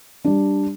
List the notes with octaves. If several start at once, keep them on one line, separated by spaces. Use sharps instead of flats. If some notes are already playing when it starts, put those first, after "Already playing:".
G3 D4